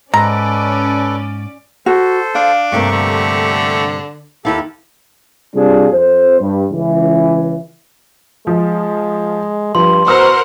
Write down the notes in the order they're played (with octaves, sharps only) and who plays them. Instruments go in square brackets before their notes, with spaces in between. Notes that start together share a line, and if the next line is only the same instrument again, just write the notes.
[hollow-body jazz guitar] G#2 [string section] C#4 D5 [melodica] A4 B4 [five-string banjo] A#5
[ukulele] F#4 [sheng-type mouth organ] A4 C5
[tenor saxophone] D4 [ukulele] F5
[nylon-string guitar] G2 C3 A#3 [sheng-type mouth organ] A3 G4 C#6
[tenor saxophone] D3
[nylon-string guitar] D#2 E4 F5 [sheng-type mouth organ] G4 A4
[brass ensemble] C3 G3 D4 F4 G#4
F2 C5
G2
C#2 E3
[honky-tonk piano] F3 [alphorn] G#3
[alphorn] G2 [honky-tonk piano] F3 [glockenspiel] C6
[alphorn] B2 [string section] A#4 C5 F#5 [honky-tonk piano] C#6 E6 F6